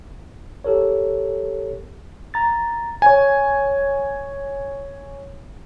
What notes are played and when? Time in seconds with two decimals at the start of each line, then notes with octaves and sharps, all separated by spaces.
0.64 G4 A4 A#4 C#5
2.34 A#5 A6
3.02 C#5 G#5